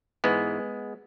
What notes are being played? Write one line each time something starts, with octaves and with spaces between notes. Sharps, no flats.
G#2 E3 G#3 B3